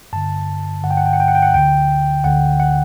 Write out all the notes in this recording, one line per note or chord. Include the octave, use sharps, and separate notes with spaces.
G2 D3 A5
G2 D3 F#5
G5
F#5
G5
F#5
G5
F#5
G5
F#5
D2 D3 G5
D2 D3 F#5
F#5